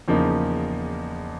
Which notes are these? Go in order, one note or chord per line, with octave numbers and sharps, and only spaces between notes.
E2 C#3 F3 A#3 D#4